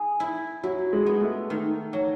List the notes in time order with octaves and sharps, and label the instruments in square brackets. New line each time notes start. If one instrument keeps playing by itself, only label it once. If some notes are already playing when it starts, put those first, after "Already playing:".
Already playing: [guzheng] G#4
E4
[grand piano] F#3 [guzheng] E4
[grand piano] G#3
[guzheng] B3
[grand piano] A3
[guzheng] D#3
F#3